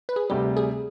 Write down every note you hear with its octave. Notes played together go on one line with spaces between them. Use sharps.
B4
G#4
D2 C3 G3 G4
G#4